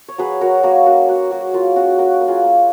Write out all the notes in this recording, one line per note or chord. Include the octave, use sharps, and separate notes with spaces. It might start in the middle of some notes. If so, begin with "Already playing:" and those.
C#5
F#3 G#4 B4
F#3 F#4 A#4
A#3 F#4 A#4
C#4 F#4
F#3 F#4
F#3 F#4
A#3 F4
C#4 F#4
A#3 F#4
A#3
F4 G#4
A#3